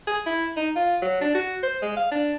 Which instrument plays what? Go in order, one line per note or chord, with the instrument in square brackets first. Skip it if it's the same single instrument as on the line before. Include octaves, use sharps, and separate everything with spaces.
[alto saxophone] G#4
E4
D#4
F4
F#3
D4
F#4
C5
G#3
F5
D4